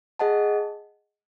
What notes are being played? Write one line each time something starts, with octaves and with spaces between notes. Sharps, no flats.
G#4 D#5 F#5 A5